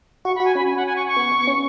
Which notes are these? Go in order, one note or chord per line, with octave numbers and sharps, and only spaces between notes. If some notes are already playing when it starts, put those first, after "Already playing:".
F#4 C#6
B5
F#4 G#5
C#4 B5
G#5
F#5
G#5
C#6
C#6
B3
B3
C#4